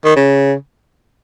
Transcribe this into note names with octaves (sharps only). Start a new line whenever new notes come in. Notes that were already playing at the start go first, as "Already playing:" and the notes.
D#3
C#3